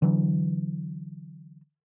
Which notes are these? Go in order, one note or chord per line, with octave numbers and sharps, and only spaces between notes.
D3 E3 F#3